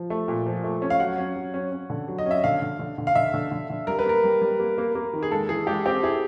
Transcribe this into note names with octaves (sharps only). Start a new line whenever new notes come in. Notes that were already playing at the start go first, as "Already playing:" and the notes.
Already playing: F3
A3
A#2
F3
A3
C#4
F5
F#3 F#5
C#4
F#3
C#4
C#4
D3
F#3
D#5
C#4
E5
D3 F5
D3
D3
D3
F5
D3 E5
D3
D3
D3
G3 A#4
B4
A#3 A#4
G3
G3
A#3
A#3
A#3
D#3
G#4
G#3 A4
E3 G#4
G#3 G4
C4 G4
E4 G#4